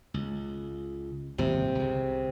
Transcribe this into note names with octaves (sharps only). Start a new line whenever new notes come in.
C#2
D#1 G#1 C3 G3
C2 C#3